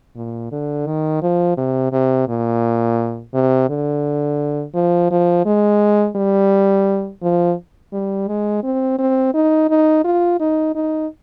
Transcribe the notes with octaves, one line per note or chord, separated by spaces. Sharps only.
A#2
D3
D#3
F3
C3
C3
A#2
C3
D3
F3
F3
G#3
G3
F3
G3
G#3
C4
C4
D#4
D#4
F4
D#4
D#4